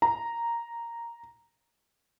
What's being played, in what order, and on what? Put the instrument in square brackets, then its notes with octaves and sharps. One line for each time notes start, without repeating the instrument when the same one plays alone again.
[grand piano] A#5